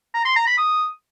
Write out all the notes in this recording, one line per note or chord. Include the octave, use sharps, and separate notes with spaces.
A#5
C6
A#5
B5
D#6